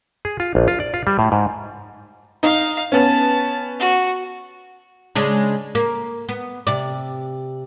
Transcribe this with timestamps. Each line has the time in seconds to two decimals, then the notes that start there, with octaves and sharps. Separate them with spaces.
0.25 G#4
0.40 F4
0.55 A#1
0.68 F4
0.80 D5
0.94 F4
1.07 G3
1.19 A2
1.32 G#2
2.43 D#4 F5
2.92 B3 C#4 A5
3.80 F#4
5.15 C#3 G#3 D4
5.75 A#3
6.29 B3
6.67 C3 D5